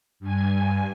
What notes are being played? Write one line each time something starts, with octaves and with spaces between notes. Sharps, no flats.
G2 G#5